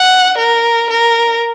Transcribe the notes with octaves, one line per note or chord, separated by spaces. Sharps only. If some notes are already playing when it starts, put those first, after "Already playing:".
Already playing: F#5
A#4
A#4